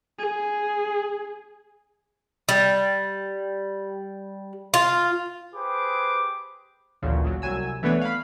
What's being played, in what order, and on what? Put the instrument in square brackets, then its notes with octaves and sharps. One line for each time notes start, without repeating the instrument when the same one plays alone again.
[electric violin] G#4
[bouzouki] G3
F4
[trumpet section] G4 G#4 B4 C5 D6
[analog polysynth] A1 D2 A#2 C#3
C#3 F#3
C2 F#3 G#5 E6
E3 A3 B3 D4 B4 C#5
F5 B5